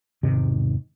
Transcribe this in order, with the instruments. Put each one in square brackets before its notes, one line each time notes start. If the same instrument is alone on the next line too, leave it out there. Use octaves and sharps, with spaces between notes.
[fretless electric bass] E1 G#2 C3 D#3